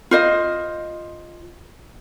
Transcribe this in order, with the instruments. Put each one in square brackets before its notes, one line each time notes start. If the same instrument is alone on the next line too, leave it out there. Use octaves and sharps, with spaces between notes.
[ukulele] F4 C5 D#5